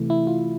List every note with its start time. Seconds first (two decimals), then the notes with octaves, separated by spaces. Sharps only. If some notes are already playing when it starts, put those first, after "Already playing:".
Already playing: C3 E3 A3
0.10 E4
0.27 F4